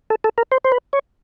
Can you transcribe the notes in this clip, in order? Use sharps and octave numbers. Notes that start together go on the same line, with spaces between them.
A4
A4
A#4
C5
C5
B4
C#5